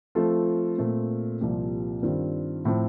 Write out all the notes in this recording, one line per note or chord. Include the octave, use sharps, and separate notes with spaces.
F3 A3 C4 F4 A4
A#2 A3 C4
C2 A#2 F3 C4 G4
G2 D#3 G3 C4 F4
A2 F3 C4